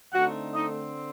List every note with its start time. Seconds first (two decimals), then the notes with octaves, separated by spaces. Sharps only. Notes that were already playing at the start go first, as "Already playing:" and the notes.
0.13 D3 A3 C4 D#4 F#4 F#5
0.54 D#4 D#5